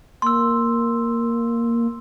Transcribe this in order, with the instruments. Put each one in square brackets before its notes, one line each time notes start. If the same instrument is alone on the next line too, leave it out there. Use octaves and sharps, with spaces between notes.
[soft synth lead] A#3 [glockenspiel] C6 E6